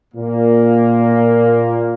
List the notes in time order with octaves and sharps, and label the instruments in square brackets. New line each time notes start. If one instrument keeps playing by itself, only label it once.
[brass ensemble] A#2 A#3